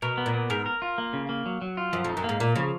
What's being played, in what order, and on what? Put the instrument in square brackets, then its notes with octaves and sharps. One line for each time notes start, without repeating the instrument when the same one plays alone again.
[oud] B2 [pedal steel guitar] A#4
[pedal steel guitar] B3
[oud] A#2
[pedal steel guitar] B3
[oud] G#2 [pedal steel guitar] A#4
[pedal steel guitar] A#4
F4
A#3
C#3
A#3
F#3
F#3
F4
[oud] F#2 [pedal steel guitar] F3
[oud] F2 [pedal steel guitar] D#4
[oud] F#2
[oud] G#2 [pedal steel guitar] A#3
[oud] A#2 [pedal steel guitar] A#3
[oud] C#3 [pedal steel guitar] F3